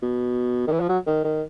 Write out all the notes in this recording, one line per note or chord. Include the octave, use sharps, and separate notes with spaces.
B2
D#3
E3
F3
F#3
D#3
D#3